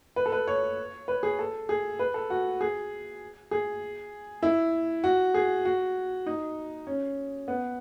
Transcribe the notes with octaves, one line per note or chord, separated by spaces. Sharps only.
B4
A4
B4
C#5
B4
G#4
A4
G#4
B4
A4
F#4
G#4
G#4
E4
F#4
G#4
F#4
D#4
C#4
B3